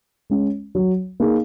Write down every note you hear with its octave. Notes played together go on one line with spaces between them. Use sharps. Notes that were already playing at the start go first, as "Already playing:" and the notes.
G#3 C#4
F#3
A#3 D#4 G#4